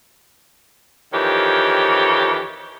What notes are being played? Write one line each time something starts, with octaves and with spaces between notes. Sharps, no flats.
F2 D#3 E3 G4 C#5